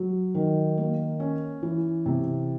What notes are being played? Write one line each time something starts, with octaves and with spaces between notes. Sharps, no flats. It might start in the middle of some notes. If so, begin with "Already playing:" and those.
Already playing: F#3
D#3
A#3
C#4
E3
C3